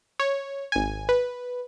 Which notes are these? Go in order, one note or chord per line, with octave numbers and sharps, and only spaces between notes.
C#5
G#1 G#5
B4